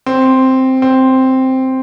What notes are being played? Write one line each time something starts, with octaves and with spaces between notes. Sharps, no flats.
C4
C4